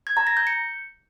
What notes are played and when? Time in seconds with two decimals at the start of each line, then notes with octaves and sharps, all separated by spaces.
0.07 G#6
0.17 A#5
0.27 A#6
0.37 G6
0.47 C#7